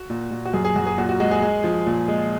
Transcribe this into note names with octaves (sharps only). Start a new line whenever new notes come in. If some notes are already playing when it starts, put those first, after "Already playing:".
Already playing: F#4
A#2
A#2
F#4
F#2 G#4
G#4
F#2 F#4
G#4
A#2 F#4
F#4
G#3 F#4
G#4
G#3
F3
A#2
G#3